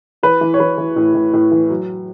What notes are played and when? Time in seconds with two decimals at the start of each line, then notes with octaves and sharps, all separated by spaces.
0.23 E3 B4
0.41 E3
0.54 C#5
0.60 E3 B4
0.78 E3
0.96 A2
1.15 A2
1.33 A2
1.51 E3
1.70 F#3